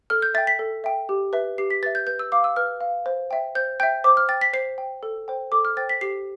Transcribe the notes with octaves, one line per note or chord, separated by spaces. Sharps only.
A4 F6
G6
E5 G5 A6
B6
A4
E5 G5
G4
B4 E5
G4 C7
B6
B4 E5 A6
G6
B4 G6
E6
F5 D6
E6
B4 F6
F5
C5
E5 G5
C5 G6
E5 G5 G6
C5 D6
F6
G5 A6
B6
C5 C7
G5
A4
C5 G5
A4 D6
F6
C5 G5 A6
B6
G4 C7